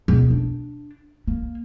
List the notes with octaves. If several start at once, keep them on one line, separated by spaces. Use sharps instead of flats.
E2 B2
D4
A#3